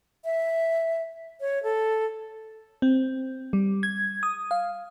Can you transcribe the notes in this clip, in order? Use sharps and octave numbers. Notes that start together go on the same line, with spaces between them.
E5
C#5
A4
C4
G3
G#6
D#6
F5